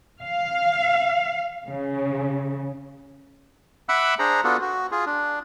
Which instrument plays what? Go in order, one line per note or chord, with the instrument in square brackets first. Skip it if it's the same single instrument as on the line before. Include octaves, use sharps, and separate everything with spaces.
[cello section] F5
C#3
[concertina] E5 F#5 B5 D6 E6 F#6
D4 G#4 C5 A#5
B3 D4 F4 F#4 A4
F#4
F4 G#4
D4